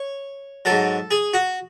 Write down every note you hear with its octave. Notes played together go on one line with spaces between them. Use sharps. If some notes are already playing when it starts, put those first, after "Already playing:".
Already playing: C#5
G#2 F#3 A4
G#4
F#4